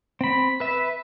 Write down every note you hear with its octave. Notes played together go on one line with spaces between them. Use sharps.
C4 B5
B4 E5